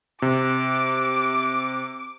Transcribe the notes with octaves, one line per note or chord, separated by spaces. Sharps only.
C3 D6